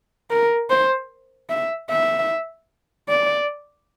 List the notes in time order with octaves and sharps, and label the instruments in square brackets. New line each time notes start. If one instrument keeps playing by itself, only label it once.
[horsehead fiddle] A#4
C5
E5
E5
D5